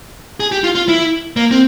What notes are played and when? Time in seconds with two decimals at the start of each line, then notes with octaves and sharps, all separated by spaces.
0.40 G#4
0.52 G4
0.64 F4
0.75 F4
0.89 E4
1.37 A#3
1.51 C4